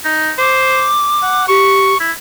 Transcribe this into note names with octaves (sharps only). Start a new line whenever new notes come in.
D#4
C5 D6
F#5
G4 C#6
E4